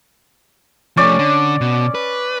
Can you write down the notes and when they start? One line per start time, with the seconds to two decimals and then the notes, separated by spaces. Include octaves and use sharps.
0.97 F3 A3 C#4 D5
1.19 D3
1.61 B2
1.95 B4